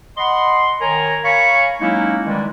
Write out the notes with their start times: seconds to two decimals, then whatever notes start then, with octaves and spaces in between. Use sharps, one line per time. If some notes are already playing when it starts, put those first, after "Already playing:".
0.17 D#5 F#5 B5 C6
0.81 D#3 A#4 C#5 G#5 A#5
1.24 C#5 F5 G#5 A#5 B5 C#6
1.81 F#3 G#3 A#3 C#4 D#4 E4
2.25 D#3 E3 G3 G#3